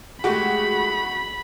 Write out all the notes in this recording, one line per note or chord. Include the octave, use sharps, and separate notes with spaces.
G#3 A3 F#4 G4 B5